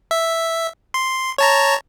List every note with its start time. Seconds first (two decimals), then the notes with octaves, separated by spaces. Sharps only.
0.11 E5
0.94 C6
1.38 C#5 A5 A#5